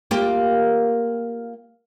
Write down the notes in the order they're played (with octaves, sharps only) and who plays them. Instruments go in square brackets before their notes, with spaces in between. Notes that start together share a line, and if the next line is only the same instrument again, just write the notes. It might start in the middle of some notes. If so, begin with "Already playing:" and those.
[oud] A#3 F4 G4